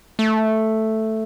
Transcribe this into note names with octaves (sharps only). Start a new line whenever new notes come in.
A3